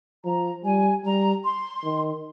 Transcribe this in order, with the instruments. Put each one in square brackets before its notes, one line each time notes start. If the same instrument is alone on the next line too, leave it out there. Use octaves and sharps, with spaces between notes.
[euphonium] F3 [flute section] A#5
[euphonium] G3 [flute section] G#5
[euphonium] G3 [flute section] A#5
[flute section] C6
[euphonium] D#3